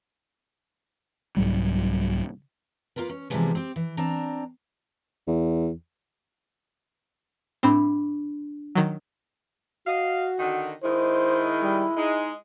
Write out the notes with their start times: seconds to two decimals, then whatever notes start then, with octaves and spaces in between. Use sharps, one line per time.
1.37 C2 G#2 F#3 G3
2.96 A#3 C#4 F4 A#4 B4
3.09 C#4
3.30 C3 E3 F3 G3 G#3 B3
3.55 C4 G4
3.76 E3
3.97 C4 D4 A#5
5.27 E2
7.63 A2 C4 D4 B5
8.75 D#3 F#3
9.87 F#4 D#5 F5
10.39 D3 D#3 F#5
10.83 D#3 G#3 E4 C5
11.63 G3
11.97 G#3 D#4